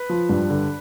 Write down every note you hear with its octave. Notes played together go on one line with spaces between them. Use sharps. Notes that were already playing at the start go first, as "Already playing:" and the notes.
Already playing: B4
F3
G2
D3